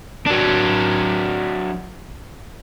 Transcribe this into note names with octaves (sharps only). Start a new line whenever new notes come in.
F#3 D4